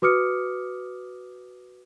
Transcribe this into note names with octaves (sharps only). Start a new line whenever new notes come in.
F#4 B4 D6 D#6 F6 C#7